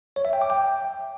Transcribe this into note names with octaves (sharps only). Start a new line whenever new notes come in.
C#5
E5
G5
D6
G5